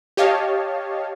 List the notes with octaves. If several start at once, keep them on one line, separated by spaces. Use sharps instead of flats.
G4 C#5 D#5 F5 A5